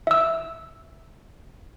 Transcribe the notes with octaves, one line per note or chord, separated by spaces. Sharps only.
E5 E6